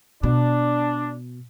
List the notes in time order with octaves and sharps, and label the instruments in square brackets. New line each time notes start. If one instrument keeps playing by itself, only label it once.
[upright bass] B2 [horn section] D4